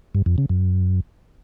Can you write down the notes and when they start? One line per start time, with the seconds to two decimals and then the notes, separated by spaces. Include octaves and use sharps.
0.15 G2
0.26 F2
0.38 C#3
0.49 F#2